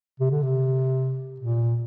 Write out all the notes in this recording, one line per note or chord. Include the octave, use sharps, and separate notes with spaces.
C3
D3
C3
A#2